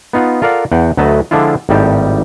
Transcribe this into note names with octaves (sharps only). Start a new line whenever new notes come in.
B3 D#4 F4 F#5
F4 A4 A#4 D5 F5 F#5
E2 F#5 G5
D2 F#3 A3 B4 D#5 A5
D3 F3 G#3 D4 E4 F4
G#1 A2 G3 D#4 G4 A5